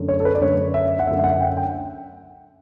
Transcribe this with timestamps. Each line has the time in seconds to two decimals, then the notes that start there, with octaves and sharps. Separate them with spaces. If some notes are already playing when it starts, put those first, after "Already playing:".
Already playing: F#2 D3 A3
0.08 C#5
0.20 A4
0.25 B4
0.35 D5
0.41 F#2 D3 A3 C#5
0.74 E5
0.99 F#5
1.07 F#2 D3 A3 E5
1.19 E5
1.24 F#5
1.41 G5
1.57 G5